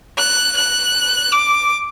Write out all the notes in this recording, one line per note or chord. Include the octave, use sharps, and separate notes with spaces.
F#6
F#6
D6